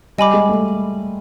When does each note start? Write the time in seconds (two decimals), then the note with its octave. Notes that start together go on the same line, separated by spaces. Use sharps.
0.18 G3 D#5 G#5 B5 D6
0.34 G#3
0.49 A3